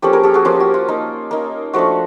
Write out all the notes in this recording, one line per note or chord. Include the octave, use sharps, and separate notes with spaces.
F3 A#3 C#4 G4 A4
G#4 A#4
G4 A4
F#4 G#4
F3 A#3 C#4 F4 G4
F#4
F4
A#3 D#4
A#3 D#4
F3 A3 D4 F#4